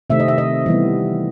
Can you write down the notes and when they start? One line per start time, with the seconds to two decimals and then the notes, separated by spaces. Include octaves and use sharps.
0.10 C3 D#3 A3 C4 E5
0.20 D#5
0.28 E5
0.38 D#5
0.66 E3 G3 B3